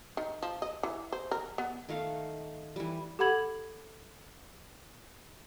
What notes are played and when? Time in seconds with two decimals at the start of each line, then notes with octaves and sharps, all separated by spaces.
0.17 D#3
0.43 F3
0.62 D#5
0.83 E3
1.12 C5
1.31 A#4
1.58 B3
1.89 D#3 A3 F5 F#5
2.76 E3 G3
3.19 G4 A4 F#5 B5 G#6 F#7